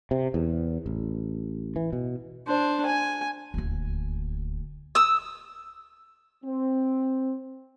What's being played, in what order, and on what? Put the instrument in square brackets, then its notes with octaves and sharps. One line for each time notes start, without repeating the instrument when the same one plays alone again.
[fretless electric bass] C3
E2
A1
E3
B2
[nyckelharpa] D4 C5
G#5
[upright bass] D#1 D2
[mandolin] D#6 E6
[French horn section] C4